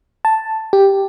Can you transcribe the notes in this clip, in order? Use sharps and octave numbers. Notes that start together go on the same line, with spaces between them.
A5
G4